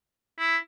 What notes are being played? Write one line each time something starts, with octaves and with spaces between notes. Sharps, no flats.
E4